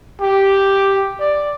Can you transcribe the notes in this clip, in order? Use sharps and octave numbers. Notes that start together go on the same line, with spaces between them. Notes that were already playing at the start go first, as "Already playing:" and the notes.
G4
D5